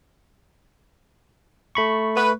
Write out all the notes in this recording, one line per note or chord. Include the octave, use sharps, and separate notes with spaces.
A3 B5 C#6
B4